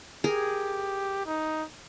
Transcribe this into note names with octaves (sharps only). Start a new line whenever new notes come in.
G4 G#4 A#4
D#4